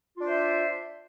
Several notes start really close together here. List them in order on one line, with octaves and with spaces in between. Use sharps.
F4 D4 C5 E5